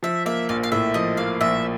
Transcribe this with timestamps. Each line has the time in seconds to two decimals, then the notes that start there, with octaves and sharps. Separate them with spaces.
0.03 F3 E5
0.26 A#3 E5
0.49 A#1 F5
0.63 F5
0.72 A2 E5
0.94 F3 D#5
1.17 A#3 F5
1.41 A#1 E5